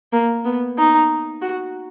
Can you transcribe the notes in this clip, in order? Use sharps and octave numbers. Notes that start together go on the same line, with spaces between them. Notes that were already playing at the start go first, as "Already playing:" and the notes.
A#3
B3
D#4
F#4